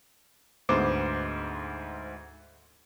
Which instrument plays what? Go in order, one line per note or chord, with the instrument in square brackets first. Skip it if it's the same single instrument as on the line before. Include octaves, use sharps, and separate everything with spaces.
[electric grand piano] D2 G#2 B3 C5 D6